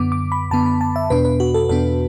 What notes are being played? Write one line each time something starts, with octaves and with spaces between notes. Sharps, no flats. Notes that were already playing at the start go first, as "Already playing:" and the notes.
Already playing: F#2 D3 B3 D6
D6
B5
F#2 D3 B3 A5
B5
A5
E5
E2 B2 B3 D4 B4
B4
F#4
A4
E2 B2 B3 D4 A4